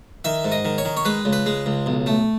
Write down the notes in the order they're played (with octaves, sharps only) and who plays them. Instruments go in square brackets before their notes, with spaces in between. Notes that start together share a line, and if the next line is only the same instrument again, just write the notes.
[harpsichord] D#3 E5
G#2
D#5
D#3
C#5
D#3
C#5
G#3 B4
C#2
B4
G#3
C#2
B1
A3